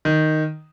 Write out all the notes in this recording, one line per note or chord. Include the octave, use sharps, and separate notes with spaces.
D#3